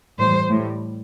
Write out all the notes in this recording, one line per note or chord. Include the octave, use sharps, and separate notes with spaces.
A2 E3 G3 C5
A2 G3